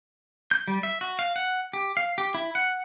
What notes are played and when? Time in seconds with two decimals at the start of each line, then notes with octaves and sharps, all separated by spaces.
0.51 G6
0.68 G3
0.83 E5
1.01 F#4
1.19 F5
1.36 F#5
1.73 G4
1.97 F5
2.18 G4
2.34 E4
2.55 F#5